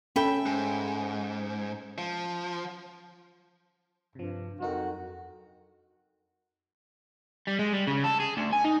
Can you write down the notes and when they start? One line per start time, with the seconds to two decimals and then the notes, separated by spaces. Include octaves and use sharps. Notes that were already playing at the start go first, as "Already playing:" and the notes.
0.16 C#4 A4 E5 G5 B5
0.46 G#2
1.98 F3
4.15 G2 C3 F3
4.60 F2 F#3 D#4 F#4 A#4
7.47 G3
7.59 G#3
7.73 G3
7.88 C#3
8.04 A4
8.20 G#4
8.37 D2
8.53 G#5
8.65 D#4